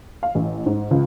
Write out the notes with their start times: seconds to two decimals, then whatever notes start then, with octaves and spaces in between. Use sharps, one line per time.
0.23 F5
0.35 A1
0.66 G#2
0.91 C#2